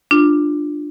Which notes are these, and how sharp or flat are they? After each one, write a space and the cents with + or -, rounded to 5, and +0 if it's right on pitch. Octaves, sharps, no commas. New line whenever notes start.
D4 +15 F4 +0